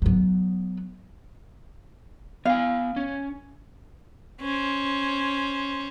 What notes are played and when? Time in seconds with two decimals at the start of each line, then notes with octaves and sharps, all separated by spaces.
0.02 F#3 B3
2.45 B3 F5 G#5
2.96 C#4
4.41 C#4 C5